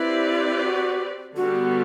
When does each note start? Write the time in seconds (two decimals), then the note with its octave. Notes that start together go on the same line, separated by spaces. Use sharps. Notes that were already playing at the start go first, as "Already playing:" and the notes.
Already playing: C4 E4 G4 B4 D5
0.63 F#4
1.36 D3 G3 B3 F#4